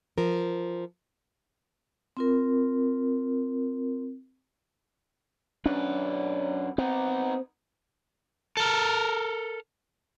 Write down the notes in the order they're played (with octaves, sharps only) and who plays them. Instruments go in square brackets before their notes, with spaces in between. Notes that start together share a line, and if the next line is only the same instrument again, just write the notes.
[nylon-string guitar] F3 A#4
[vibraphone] C4 F4 A#4
[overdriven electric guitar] F#2 B4 [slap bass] C#4 D4
[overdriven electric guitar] B3 D#4 [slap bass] C4
[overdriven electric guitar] A4 A#4